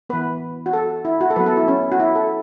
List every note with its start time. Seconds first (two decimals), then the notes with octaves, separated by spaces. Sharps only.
0.09 E3 B3 B4
0.66 F#4
0.73 A4
1.05 E4
1.21 F#4
1.31 A4
1.36 F#3 B3 B4
1.46 A4
1.57 E4
1.68 C#4
1.92 F#4
2.00 E4
2.15 A4